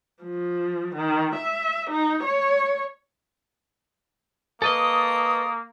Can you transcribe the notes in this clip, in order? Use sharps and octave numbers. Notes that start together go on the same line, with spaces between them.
F3
D#3
E5
D#4
C#5
A#3 A4 B4 D#5 A5 C#6 D#6